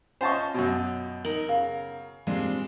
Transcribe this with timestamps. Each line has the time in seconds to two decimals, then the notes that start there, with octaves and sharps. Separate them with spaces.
0.21 C#4 F4 C5 D#5 A5 C#6
0.54 F#2 B2
1.25 D#4 A#4 F#7
1.49 C#3 F5
2.27 A#2 G3 G#3 C4 D4